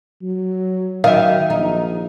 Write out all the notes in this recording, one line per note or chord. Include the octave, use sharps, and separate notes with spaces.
F#3
D#3 F#3 E5 F5
A#1 D#4